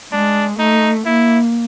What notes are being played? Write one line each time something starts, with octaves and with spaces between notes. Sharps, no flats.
G#3 D4
A3 D#4
A#3 E4